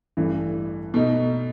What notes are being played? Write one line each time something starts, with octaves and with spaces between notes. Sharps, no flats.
A1 G2 E3 A3
B2 A3 D#4